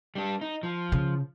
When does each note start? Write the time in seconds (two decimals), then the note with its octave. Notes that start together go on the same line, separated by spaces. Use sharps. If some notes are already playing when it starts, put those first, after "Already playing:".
0.15 G3 D4
0.41 D#4
0.63 F3
0.92 C#3